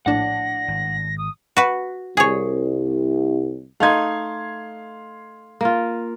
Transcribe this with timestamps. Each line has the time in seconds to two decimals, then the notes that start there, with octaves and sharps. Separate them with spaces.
0.06 A#1 A2 D4 F#5 A#6
0.68 G#1
1.18 D#6
1.57 F#4 B4
2.17 C2 G#4 C#5
3.80 A3 D#4 F5 C6 G#6
5.61 A#3 F4